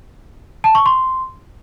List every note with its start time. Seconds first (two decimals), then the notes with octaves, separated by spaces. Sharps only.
0.64 A5
0.75 C#6
0.86 C6